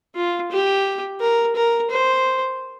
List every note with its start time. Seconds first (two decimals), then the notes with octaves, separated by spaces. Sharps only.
0.15 F4
0.51 G4
1.21 A#4
1.56 A#4
1.91 C5